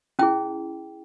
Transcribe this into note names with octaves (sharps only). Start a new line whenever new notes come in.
C#4 E4 G#4 G5